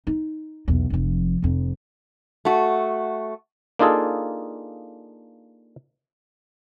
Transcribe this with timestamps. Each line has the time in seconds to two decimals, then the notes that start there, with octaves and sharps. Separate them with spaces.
0.07 D#4
0.68 B1 E2
0.90 F1 F3
1.42 F1 F2
2.45 A3 F#4
3.79 A#3 D4 D#4 F4 G#4 A4